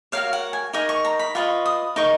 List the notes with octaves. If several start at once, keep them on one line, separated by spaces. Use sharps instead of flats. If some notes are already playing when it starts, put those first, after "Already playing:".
F#4 A#4 C#5 F5
F#5
G#5
D#4 A#4 D#5 C#6
C#6
A#5
B5
F4 B4 D#5 C#6
D#6
D#4 A#4 D#5 C#6